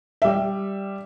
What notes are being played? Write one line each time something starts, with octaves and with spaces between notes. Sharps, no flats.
G3 E5